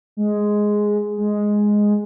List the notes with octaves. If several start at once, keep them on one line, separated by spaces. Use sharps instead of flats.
G#3
G#3